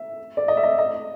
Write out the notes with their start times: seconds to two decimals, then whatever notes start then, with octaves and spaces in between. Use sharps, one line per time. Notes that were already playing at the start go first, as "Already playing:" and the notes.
Already playing: E5
0.37 D5
0.48 D#5
0.57 E5
0.63 D#5
0.78 D#5